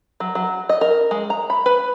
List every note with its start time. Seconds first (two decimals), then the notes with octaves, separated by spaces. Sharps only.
0.20 F#3
0.35 F#3
0.69 D#5
0.81 A#4
1.11 G#3
1.30 A#5
1.50 B5
1.66 B4